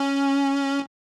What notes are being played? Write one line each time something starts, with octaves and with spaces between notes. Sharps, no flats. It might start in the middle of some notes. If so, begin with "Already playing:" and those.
Already playing: C#4